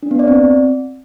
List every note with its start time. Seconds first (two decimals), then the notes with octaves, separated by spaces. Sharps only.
0.03 D4
0.11 B3
0.19 D5
0.28 C4